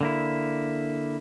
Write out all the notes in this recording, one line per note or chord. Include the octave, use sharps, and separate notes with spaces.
D3 A#3 E4